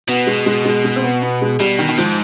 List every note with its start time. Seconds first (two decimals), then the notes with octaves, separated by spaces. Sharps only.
0.08 B2 B3
0.27 G#3
0.46 G#3
0.65 G#3
0.84 G#3
0.96 C4
1.03 B3
1.22 B3
1.42 G#3
1.60 B2 G3
1.79 D#3
1.89 D#3
1.98 G#2 F3